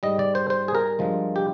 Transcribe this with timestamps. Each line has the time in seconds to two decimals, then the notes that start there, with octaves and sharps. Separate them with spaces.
0.03 G#2 G3 D#5
0.19 D5
0.35 C5
0.50 C5
0.68 G#4
0.75 A#4
0.99 G2 F3 G#3
1.36 G4